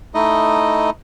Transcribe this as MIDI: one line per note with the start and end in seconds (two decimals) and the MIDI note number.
0.14 0.90 57
0.14 0.90 63
0.14 0.90 64
0.14 0.90 75